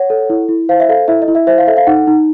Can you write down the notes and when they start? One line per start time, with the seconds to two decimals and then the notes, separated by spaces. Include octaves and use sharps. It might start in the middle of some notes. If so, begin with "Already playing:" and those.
Already playing: C#5 F#5
0.10 A4
0.30 E4
0.49 E4
0.69 C5 F5
0.80 E5
0.89 A4 F5
1.08 E4 E5
1.22 D#5
1.28 E4
1.35 E5
1.47 C5 E5
1.58 F5
1.67 A4 E5
1.77 F5
1.87 D#4 F#5
2.07 D#4